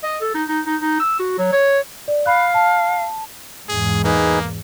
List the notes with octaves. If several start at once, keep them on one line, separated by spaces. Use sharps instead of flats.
D#5
A4
D#4
D#4
D#4
D#4
E6
F#4
F#3
C#5
D5
F5 B5 F#6
A5
E2 G#2 G#4
A#3 D#4 G#4 B4